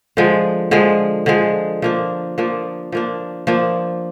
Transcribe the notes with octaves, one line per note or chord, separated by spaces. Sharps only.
D3 F3 G#3
D3 F3 G#3
D3 F3 G#3
F3 A#3 D4
F3 A#3 D4
F3 A#3 D4
F3 A#3 D4